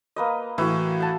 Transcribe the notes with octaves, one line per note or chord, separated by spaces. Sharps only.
A#3 B4 D#5
A2 E3 E4 F#4
F#5 A5